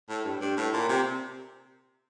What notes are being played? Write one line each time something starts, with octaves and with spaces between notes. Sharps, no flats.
A2
G2
G2
A2
A#2
C3